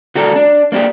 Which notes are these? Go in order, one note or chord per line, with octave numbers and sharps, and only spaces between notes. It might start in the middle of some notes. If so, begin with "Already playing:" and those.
D3 G3 F#4 G4 A4 A#4
D4
A#3 D4 E4 G4 G#4